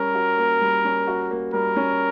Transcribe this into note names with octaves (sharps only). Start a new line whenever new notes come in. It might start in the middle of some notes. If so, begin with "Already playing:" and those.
Already playing: G3 C#4 A#4
F#4
A#3
G3
C#4
F#4
A#3
G3 A#4
C#4